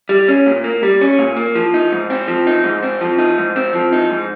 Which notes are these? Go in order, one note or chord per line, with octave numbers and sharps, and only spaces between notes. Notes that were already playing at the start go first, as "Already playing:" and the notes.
G3
C#4
A#2
A#3
G3
C#4
A#2
A#3
F3
D#4
G#2
C4
F3
D#4
G#2
C4
F3
D#4
G#2
C4
F3
D#4
G#2